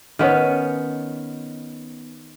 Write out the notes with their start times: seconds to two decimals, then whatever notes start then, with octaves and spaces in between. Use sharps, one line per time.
0.19 D#3 B3 C#4